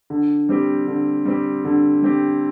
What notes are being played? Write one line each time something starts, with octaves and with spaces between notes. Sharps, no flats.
D3
G3 C4 G4
D3
G3 C4 G4
D3
G3 C4 G4